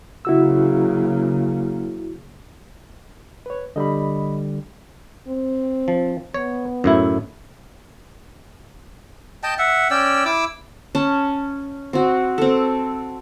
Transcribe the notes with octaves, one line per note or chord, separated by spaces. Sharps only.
C#3 F#3 A#3 E4 F#4 E6
B4 C#5
D3 G3 D#5 B5
C4
F3
B3 C#5
F#2 A2 E4
D#5 G5 A5
E5 F#5
C#4 D5 G5 E6
E4 D6 E6
C#4 A5
C4 F#4
C4 A4